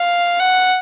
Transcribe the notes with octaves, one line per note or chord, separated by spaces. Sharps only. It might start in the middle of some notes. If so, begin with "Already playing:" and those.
Already playing: F5
F#5